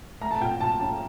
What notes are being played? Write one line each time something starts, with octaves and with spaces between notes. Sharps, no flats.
A3 A#5
A5
A#2 G5
G5
A#2 A5
C#4 A5